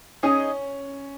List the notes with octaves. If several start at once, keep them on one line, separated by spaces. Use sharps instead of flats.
C#4 D#4 G#4 D#5 G#5